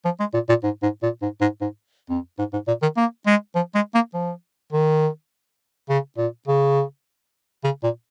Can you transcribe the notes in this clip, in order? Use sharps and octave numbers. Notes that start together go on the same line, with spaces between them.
F3
G#3
A#2
A#2
G#2
G#2
A#2
G#2
G#2
G#2
F2
G#2
G#2
A#2
D#3
A#3
G#3
F3
G#3
A#3
F3
D#3
C#3
A#2
C#3
C#3
A#2